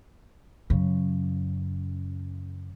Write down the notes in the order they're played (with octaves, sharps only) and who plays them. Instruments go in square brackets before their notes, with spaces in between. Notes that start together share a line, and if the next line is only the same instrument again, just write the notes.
[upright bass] F#2 C#3